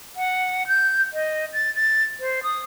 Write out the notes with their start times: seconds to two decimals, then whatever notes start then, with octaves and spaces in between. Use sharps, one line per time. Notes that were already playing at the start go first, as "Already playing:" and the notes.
0.16 F#5
0.67 G6
1.13 D#5
1.53 A6
1.75 A6
2.20 C5
2.43 D#6